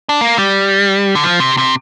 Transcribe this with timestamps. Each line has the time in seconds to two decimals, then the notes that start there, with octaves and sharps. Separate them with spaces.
0.09 D4
0.21 A#3
0.38 G3
1.15 D3
1.24 F3
1.40 C3
1.58 C3